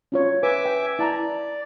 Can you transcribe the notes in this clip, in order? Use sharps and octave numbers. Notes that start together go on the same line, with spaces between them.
C#4 F4 C#5
B4 E5 G#5 D6
G5
E4 D5 A5 A#5